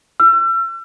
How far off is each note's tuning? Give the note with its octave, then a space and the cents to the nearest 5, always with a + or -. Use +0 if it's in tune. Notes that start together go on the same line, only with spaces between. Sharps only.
E6 +40